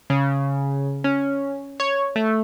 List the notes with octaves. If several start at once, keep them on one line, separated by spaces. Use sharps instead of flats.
C#3
C#4
C#5
A3